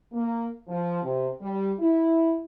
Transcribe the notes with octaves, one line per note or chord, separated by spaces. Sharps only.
A#3
F3
C3
G3
E4